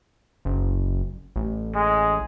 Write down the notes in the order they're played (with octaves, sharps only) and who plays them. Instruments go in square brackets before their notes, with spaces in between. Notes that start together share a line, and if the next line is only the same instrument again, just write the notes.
[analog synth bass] F#1
A1
[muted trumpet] G#3